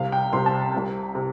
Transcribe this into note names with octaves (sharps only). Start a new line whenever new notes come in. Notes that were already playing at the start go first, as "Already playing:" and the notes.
Already playing: C2 C3 F5
G5
C2 C3 C6
A5
C2 C3
C3